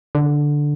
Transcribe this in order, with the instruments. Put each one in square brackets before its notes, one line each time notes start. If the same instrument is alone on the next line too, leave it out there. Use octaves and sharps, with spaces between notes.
[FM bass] D3